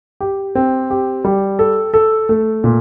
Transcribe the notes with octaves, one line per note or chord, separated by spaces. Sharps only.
G4
C4
G4
G3
A4
A4
A3
A#2